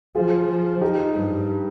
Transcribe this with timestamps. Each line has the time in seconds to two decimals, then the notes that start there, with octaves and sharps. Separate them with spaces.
0.15 F3 F4 G#4
0.48 F3
0.81 D#4 G4
1.15 G2